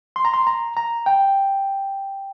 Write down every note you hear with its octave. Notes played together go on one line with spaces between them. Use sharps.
C6
A#5
C6
A#5
A#5
G5